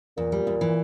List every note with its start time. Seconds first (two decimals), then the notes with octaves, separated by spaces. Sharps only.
0.17 E2 A#2
0.32 G3
0.47 E2
0.61 E3